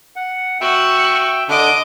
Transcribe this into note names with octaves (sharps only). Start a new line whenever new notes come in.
F#5
F#4 E5 G5
D3 D4 D#5 D6